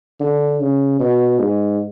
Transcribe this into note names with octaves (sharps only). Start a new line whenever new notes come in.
D3
C#3
B2
G#2